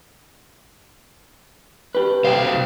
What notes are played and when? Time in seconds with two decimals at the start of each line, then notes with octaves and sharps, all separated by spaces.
1.95 G4 B4
2.24 C2 C5 F5 G5